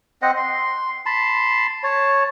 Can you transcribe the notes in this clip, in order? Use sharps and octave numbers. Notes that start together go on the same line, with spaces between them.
C4 C5 D#5 F#5
C6
A5 B5 C6
C#5 A5